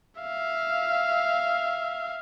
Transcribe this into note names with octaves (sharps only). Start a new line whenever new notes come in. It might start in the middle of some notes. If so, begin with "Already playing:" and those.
E5 F5